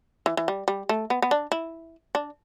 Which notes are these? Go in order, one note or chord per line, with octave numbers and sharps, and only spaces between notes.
E3
E3
G3
G3
A3
B3
B3
D4
E4
D4